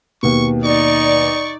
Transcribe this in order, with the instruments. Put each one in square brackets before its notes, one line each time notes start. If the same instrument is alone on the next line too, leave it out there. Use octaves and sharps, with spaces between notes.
[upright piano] D#2 B2 [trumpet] C#6
[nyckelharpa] D#4 [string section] D5 [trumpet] C#6